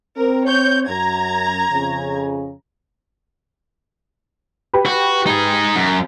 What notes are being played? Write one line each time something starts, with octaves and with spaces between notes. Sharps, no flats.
C4 A#4
C#5 G6
F#2 A#5 G#6
F2 C#3
G4 B4
F#4
D#4 G#4
F#2